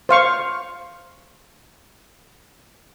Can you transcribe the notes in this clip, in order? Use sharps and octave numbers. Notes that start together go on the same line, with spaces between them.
C5 F5 C#6